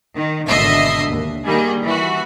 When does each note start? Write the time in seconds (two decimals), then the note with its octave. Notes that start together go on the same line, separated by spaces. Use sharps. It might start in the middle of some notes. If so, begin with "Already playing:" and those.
0.15 D#3
0.48 G#1 B2 D3 D#5 E5 C7
1.11 D#2
1.45 D#3 G3 A#3 G#4
1.83 E3 F#4